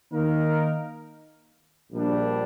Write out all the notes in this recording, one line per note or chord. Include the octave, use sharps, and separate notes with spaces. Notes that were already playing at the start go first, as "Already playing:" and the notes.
D#3 A#3 D#4 A#4
A#1 A#2 G3 D4